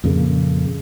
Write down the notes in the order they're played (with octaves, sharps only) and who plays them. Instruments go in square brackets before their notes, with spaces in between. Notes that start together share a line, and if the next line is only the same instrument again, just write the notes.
[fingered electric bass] F2 A#2 C#3